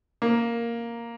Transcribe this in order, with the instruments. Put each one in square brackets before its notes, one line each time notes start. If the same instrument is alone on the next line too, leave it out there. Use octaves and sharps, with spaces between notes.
[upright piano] A#3